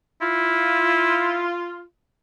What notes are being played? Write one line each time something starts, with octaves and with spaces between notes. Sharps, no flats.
E4 F4